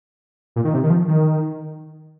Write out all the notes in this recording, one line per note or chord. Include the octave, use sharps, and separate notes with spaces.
A#2
D#3
C3
D#3
F3
D#3